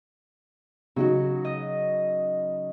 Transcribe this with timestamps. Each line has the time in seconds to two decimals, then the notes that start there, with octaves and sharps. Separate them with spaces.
0.96 C#3 F#3 D#4 F#4
1.45 D#5